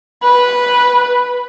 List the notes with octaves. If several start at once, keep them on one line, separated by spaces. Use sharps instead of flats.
B4